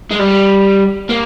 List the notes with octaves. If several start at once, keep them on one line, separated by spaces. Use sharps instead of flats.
G#3
G3
A#3